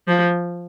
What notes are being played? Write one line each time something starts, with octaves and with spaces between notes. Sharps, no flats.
F3